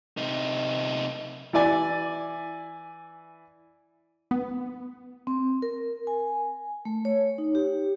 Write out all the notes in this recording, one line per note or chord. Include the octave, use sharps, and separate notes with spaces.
C3 D#4
E3 E4 D5 G#5
B3
C4
A#4
G#5
A3
C#5
D#4
G4